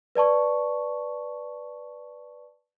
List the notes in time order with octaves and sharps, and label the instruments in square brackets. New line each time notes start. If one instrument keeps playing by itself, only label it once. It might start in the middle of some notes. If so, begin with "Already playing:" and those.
[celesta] B4 D5 A5 C#6